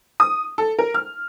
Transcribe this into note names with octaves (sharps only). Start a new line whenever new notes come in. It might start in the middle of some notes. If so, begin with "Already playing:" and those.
D#6
A4
A#4
F6